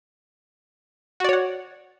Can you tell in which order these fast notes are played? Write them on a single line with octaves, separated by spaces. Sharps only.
F#4 D5 C#5 F#5